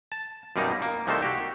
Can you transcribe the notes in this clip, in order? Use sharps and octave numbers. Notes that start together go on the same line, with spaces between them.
A5
F#2 B2 G3 A#3 D#4
A#3
C2 D#3 A3 A#3 A4 C5
F#4 G4